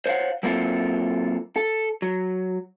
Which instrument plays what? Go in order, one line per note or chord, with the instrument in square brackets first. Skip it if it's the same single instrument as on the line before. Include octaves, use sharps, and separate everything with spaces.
[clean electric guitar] C5 C#5 D#5 F5 F#5
F#3 A#3 C4 E4 F4 A4
A4
F#3